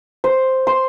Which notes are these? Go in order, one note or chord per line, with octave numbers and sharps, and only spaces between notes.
C5
C6